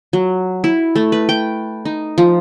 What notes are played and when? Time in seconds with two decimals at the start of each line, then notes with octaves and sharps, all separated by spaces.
0.13 F#3
0.64 E4
0.96 A3
1.12 B4
1.29 G5
1.85 D#4
2.18 F3